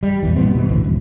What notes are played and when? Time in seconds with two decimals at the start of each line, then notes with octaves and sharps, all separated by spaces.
0.03 G3
0.23 A#1 E2 E3
0.36 A#2 G3 B3 C4
0.55 B2 E3
0.69 A1 D2
0.84 D#1